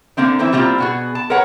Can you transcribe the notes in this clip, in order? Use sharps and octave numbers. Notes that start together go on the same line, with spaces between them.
D3 A#3 C4 D4
D#3 E3 C4 E4
G3 A#3 C4 C#4 E4 F4
B2 F#4 G#4
A5
A#4 B4 C#5 F#5 A#5